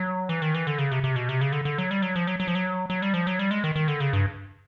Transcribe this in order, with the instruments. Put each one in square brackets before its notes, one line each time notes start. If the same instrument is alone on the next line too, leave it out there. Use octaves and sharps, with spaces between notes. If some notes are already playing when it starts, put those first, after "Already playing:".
Already playing: [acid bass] F#3
E3
D#3
E3
D3
C#3
C3
C3
B2
C3
C#3
D3
D3
F#3
G3
F#3
F3
F#3
F#3
F3
F#3
F#3
G3
F3
F#3
G3
G#3
D#3
D#3
D3
C#3
G2